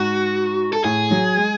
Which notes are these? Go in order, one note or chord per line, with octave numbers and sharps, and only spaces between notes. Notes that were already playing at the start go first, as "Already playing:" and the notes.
Already playing: G#2 F#4
A4
A2 G#4
F#3
G#3